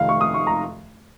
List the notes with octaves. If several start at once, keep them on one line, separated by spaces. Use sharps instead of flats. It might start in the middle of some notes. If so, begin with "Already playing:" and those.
Already playing: F1 F2 D#3 F5
C#6
D#6
C#6
A#5